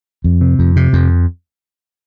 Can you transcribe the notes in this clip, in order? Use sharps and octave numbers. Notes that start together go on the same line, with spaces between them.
F2
C3
F2
C3
F2